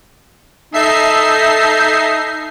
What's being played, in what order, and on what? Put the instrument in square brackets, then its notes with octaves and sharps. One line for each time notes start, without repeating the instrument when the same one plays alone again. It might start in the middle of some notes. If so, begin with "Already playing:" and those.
[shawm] D#4 [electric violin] A4 [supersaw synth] E5 C7